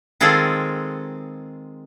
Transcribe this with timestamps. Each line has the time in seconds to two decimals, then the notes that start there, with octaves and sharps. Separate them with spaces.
0.20 D#3 G#3 C4 F4 G#4 A4